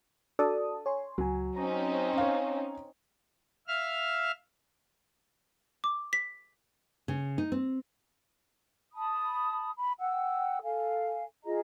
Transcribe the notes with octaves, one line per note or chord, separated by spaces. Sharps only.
D4 F#4 A4 D5 A5 D#6
C#5 G#5 C6
C#2 F#3 G#5
C4 C#4 D#4 A#5
C#5 F5
E5 F5 F6
D6
B6
C#3
D#4
C4
A5 B5 D#6
B5
F#5 G5 E6
A4 F5 G#5
F4 G#4 D#5 A#5